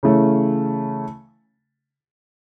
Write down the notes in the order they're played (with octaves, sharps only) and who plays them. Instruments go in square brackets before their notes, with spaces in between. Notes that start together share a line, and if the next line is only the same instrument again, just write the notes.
[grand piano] C#3 E3 A3 C#4